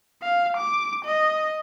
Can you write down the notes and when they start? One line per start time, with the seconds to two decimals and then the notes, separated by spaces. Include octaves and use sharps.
0.22 F5
0.57 D6
1.05 D#5